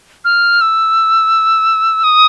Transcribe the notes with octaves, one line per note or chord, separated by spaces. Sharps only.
F6
E6
D#6